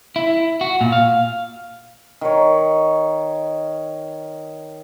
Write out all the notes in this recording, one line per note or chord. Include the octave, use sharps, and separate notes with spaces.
E4
F#4
A#2
F5
D#3 C#5